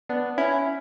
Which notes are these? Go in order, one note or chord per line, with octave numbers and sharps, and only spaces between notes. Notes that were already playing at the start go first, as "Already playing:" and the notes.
B3 D4
C#4 E4